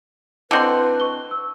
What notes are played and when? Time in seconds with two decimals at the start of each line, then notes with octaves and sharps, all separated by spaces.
0.51 D3 C4 E4 B4 D#5 C6 F#7
1.00 C#6 G7
1.31 E6